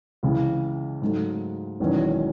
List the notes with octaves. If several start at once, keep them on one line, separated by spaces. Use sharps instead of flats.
C#2 C#3 E3
G#2 F#3 A3
E1 E2 D#3 F#3 C#4